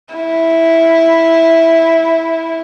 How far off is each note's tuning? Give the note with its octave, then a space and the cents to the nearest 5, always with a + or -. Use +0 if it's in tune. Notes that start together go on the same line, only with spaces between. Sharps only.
E4 -5